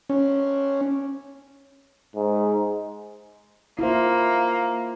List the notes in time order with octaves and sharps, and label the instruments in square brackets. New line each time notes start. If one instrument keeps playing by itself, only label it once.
[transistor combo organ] C#4
[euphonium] G#2
[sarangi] A#3 [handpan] E4 F4 C5